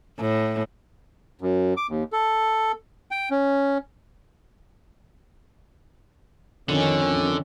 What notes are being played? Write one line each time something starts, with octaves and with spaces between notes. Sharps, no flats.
A2
F#2
D6
D#2
A4
G5
C#4
F2 D3 D#3 C#4